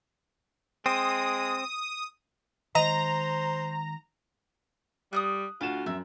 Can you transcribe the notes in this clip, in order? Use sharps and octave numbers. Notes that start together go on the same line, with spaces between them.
G#3 C4 D#6
D#3 G#3 C5 D#5 A#5
G3 D#6 F6 F#6
D2 F4 F#4 F5 E7
F#2 C4 E5